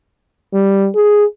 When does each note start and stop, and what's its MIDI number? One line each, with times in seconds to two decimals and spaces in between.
0.54 0.88 55
0.95 1.24 68